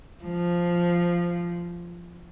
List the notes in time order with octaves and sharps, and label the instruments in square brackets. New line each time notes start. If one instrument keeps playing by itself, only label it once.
[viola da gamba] F3